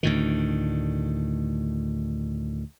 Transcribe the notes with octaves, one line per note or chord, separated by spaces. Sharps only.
D2 A2 D#3